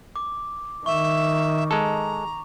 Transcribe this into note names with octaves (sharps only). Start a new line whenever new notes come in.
D6
D#3 E5 C#6
G#3 A4 A#5